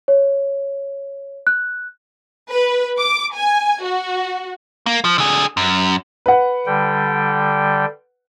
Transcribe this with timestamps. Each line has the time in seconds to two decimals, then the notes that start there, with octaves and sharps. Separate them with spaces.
0.08 C#5
1.47 F#6
2.51 B4
2.98 D6
3.34 G#5
3.83 F#4
4.86 A#3
5.04 F3
5.18 D3 G#4
5.57 F#2
6.26 B4 F#5
6.66 D3 G3 G5